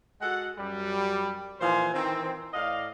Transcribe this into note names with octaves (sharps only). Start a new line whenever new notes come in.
G#3 F#4 A4 F#5
F#2 G3
A#2 E3 F3 C5 G#5
D#3 E3 C4
A2 D5 D#5 F5